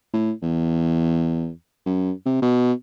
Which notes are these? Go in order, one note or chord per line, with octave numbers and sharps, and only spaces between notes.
A2
E2
F#2
C3
B2